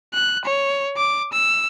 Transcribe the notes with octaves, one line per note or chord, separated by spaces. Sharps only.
F#6
C#5
D6
E6